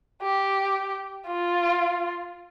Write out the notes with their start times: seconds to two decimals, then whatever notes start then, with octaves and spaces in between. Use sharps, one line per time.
0.22 G4
1.27 F4